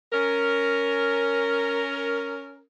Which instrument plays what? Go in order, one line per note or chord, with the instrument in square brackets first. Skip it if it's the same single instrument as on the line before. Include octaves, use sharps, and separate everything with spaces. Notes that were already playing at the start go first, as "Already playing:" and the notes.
[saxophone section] C#4 A#4